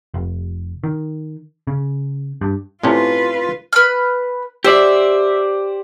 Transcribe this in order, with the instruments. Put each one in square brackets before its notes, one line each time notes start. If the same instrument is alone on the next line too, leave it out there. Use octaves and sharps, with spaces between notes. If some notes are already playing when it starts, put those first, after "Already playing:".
[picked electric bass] F1
D#3
C#3
G2
[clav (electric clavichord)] A2 C3 C#4 [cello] F4 B4
[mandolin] B4 F6
[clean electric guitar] G4 C5 D5 [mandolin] E5